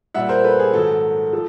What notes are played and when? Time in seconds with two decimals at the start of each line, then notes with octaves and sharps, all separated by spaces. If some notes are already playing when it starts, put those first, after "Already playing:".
0.14 A#2 G3 E5 F#5
0.29 A#4 C5
0.44 A4 B4
0.60 G#4
0.73 G#2 D#3 F#3 A4
1.33 F3 A4